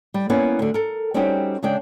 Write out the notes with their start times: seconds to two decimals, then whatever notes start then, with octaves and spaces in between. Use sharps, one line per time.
0.14 G3
0.30 A#3 B3 C#4 E4 B4 D5
0.59 D2 D3
0.74 A4 A#4
1.14 G3 C4 C#4 D#4 F#4 G4
1.63 C#3 G#3 D4 G5